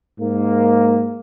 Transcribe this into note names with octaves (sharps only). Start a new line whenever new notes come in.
G#2 A#3